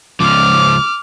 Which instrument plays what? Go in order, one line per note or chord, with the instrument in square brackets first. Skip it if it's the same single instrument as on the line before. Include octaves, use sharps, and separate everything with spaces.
[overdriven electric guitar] C#2 F3 [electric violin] D6 F6